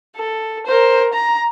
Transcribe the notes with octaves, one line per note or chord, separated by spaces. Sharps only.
A4
A#4 C5
A#5